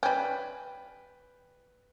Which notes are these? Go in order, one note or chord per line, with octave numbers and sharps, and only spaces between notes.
G3 C#4 B4 G5